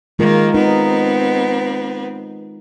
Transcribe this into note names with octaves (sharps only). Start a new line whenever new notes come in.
D#3 G#3 A#3 F4 A#4
B3 C4 D#4